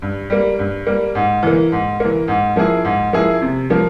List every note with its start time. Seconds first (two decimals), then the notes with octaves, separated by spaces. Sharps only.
0.02 G2
0.30 G3 A#3
0.59 G2
0.87 G3 A#3
1.15 G#2
1.43 E3 A#3
1.72 G#2
2.00 E3 A#3
2.28 G#2
2.56 F3 A#3 E4 G#4
2.85 G#2
3.13 F3 A#3 E4 G#4
3.41 C3
3.70 F3 A#3